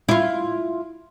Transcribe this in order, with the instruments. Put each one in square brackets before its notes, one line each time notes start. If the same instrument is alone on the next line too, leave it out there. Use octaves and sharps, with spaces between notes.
[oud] E4 F4